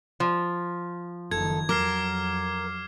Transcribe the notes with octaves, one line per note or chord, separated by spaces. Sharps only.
F3
F#1 D#3 A4 G#6
F2 F#3 A#4 D6 F6 C7